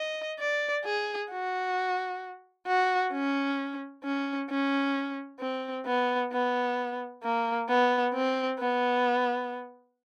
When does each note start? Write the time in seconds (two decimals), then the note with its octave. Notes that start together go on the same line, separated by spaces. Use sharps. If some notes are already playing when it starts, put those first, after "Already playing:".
Already playing: D#5
0.39 D5
0.85 G#4
1.31 F#4
2.67 F#4
3.12 C#4
4.04 C#4
4.50 C#4
5.40 C4
5.86 B3
6.32 B3
7.23 A#3
7.69 B3
8.14 C4
8.59 B3